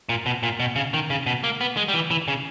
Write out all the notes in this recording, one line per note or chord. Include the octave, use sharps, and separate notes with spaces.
A#2
B2
A#2
B2
C#3
D#3
C#3
B2
A#3
B3
G#3
G3
E3
E3
C#3